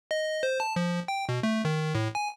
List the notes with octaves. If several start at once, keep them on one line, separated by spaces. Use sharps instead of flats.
D#5
C5
A5
F3
G5
B2
A3
D#3
A2
G#5